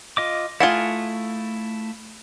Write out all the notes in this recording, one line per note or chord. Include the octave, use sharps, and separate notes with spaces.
F4 D#5 D6
A3 E4 F4 G#4 F#5